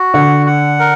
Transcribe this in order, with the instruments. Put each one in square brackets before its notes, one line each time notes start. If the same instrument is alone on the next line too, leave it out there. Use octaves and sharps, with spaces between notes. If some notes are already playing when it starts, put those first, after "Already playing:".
Already playing: [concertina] F#4
[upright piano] D3 [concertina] F#5
[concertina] F#5
A#4